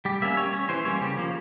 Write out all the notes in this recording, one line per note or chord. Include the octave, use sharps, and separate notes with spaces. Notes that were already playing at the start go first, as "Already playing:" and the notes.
G3 G4
A#3 C#4 E5
G3 C#5
C#4 C#5
E3 C5
G3 A#3 C#4 C#5
C#3 G4
F3 A#3